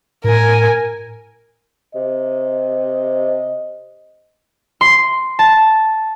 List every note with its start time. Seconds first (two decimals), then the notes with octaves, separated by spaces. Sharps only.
0.24 A2 A#4 G#5
1.95 C3 D#5
4.81 C6
5.39 A5